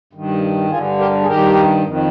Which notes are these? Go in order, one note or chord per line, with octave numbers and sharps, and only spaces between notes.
G2 D#3
G2 D3 F4 G#4
G4 A#4
G#4
G2 D#3 G4 A#4
F2 D#3